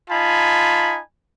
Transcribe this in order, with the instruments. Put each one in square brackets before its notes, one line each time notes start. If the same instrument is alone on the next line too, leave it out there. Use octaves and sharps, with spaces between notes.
[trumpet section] D#4 F4 G#5 A5 B5